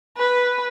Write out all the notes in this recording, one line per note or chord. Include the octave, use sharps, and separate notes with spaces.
B4